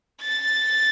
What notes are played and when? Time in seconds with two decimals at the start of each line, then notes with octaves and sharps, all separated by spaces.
0.21 A6